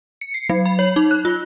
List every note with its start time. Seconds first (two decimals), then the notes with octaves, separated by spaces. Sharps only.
0.21 C#7
0.34 C7
0.49 F#3
0.65 B5
0.79 C#5
0.96 D#4
1.11 F#6
1.25 F4